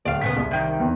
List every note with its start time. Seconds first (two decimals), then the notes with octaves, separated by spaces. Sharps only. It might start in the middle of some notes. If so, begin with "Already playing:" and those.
0.05 D1 D5 F5
0.22 A#2 C#3 B3 B6
0.37 C2
0.51 C3 D#3
0.80 E2